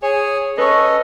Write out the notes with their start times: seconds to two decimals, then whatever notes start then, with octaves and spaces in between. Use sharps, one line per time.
0.03 G#4 C#5 G#5
0.58 C#4 A4 B4 C#5 D#5 C#6